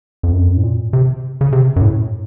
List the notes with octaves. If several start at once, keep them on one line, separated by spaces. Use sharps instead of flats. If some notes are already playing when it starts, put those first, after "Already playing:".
F2
F#2
F2
F#2
A2
A#2
C3
C#3
C3
F#2
A2